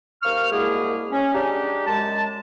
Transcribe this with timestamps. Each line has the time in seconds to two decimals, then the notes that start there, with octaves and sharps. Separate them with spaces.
0.23 D#2 A#3 C5 C#6 F6
0.51 C2 B2 G#3 A#3 E4 G#4
1.12 C#4
1.33 G3 G#3 D4 D#4 G4
1.87 F#2 G#3 A5